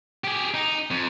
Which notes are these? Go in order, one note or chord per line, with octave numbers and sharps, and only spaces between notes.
G4 G#4
D#4
F2